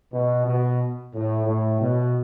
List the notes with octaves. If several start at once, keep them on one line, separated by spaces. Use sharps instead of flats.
B2
B2
A2
A2
B2